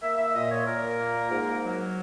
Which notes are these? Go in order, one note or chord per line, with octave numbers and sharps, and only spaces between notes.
A#3 E5
E5
A#2 D#5
C#5
A#2 A#4
A#3
G#2
F#3